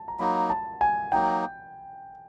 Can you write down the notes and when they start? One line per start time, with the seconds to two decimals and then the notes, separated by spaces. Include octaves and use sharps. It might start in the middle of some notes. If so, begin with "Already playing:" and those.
Already playing: A5
0.08 A#5
0.19 F#3 A#3 D#4 B5
0.50 A5
0.81 G#5
1.12 F#3 A#3 D#4 G5